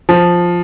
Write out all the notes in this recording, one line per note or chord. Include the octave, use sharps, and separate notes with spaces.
F3